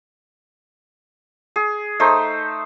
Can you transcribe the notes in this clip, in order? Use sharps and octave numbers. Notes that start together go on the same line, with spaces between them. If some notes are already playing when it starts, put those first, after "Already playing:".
G#4
A3 D#4 C5